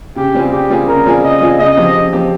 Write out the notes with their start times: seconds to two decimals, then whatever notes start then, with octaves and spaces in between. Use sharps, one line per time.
0.16 C#3 G4
0.35 G3 C4 F4 G#4
0.52 C#3 G4
0.70 G3 C4 F4 G#4
0.87 C#3 A#4
1.06 G3 C4 F4 G#4
1.24 C#3 D#5
1.41 G3 C4 F4 G#4
1.59 C#3 D#5
1.77 F3 C4 G4
1.95 C#3
2.13 F3 C4 G4